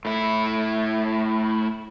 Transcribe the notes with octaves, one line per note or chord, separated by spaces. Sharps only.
A2 E4